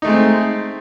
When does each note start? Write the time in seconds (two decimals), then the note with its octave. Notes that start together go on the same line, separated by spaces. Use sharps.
0.02 D#4
0.05 A3
0.07 G#3
0.10 C4